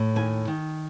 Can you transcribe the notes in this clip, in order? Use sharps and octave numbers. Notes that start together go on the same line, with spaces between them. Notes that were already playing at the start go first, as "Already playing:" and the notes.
Already playing: A2
D#2 G#5
D#3